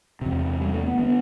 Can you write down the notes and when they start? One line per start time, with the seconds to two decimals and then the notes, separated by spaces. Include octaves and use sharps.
0.21 E2 C3
0.61 G3
0.74 A3
0.86 B3
0.99 D3 B3